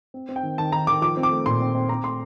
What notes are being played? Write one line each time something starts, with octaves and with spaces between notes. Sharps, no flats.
C4
C4
G5
D#3
D#3 A5
D#3 A#5
D#3 D6
F3 D6
C4
D6
A3
A#2 C6
C4
C4
C4 A#5
A3 C6